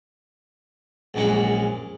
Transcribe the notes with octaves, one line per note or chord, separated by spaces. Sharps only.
A#1 F#2 G#3 A#3 F#5